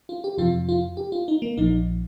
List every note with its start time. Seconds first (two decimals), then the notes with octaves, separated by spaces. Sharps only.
0.09 F4
0.24 G4
0.38 F2 C3 F3 F4
0.69 F4
0.97 G4
1.12 F4
1.28 D#4
1.42 A#3
1.57 A#1 A#2 F3 D#4